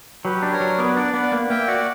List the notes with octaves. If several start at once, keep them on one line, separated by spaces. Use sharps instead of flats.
F#3 G4 B4
D4
A#4 C#5
F#3
B3 B4 D5
D4 D5 F#5
B3 D5 F#5
A#3
A#3 E5 G5
F#4 D5 F#5